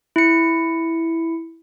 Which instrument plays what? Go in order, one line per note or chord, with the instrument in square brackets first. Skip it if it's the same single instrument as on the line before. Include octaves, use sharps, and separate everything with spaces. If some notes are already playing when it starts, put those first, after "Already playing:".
[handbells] E4 C#7